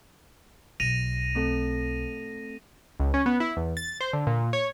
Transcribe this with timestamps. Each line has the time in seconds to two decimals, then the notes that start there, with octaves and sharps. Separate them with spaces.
0.80 B1 A#6 D#7 F7
1.35 A3 C4 A4
3.00 C#2
3.14 C#4
3.26 B3
3.40 E4
3.57 E2
3.77 A6
4.01 C5
4.13 D3
4.27 A#2
4.53 C#5